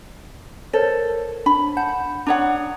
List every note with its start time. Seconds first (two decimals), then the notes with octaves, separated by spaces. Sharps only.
0.73 A4 A#4 C5 C#5
1.46 D4 B5
1.77 F#5 A5 G6
2.26 D4 C#5 F#5 A#5 D#6